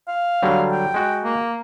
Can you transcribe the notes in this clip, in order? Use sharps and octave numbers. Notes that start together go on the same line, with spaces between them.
F5
D3 F#3 G3
G5
G#3 F#4
A#3